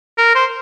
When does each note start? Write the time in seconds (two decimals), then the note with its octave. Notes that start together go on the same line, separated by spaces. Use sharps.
0.18 A#4
0.35 C5